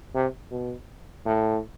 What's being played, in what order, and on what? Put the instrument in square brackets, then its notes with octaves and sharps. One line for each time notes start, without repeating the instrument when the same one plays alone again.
[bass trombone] C3
B2
A2